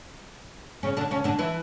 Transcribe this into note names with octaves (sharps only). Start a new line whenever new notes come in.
C#3 C#4
D3 D4
C#3 C#4
D3 D4
E3 E4